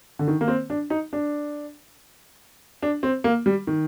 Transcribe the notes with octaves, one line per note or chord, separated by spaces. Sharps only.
D3
D#3
A#3
C4
D4
D#4
D4
D4
C4
A#3
G3
D#3